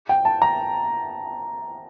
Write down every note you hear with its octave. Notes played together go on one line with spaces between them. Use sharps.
G5
A5
A#5